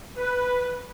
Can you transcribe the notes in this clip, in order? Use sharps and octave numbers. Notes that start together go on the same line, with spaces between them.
B4